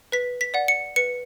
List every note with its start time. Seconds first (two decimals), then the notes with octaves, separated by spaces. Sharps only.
0.12 B4 B6
0.41 B6
0.54 D5 F#5
0.68 C#7
0.96 B4 C#7